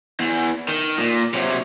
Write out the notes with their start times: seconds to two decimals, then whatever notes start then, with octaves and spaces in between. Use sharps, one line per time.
0.20 E2
0.68 D#3
0.98 A#2
1.34 C3 F#3